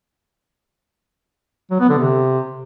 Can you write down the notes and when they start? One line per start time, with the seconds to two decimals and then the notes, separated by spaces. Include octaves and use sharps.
1.71 F#3
1.80 B3
1.89 D3
1.98 C3